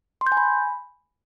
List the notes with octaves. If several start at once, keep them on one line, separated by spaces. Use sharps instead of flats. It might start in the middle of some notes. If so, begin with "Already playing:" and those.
C6
G6
G#5
B5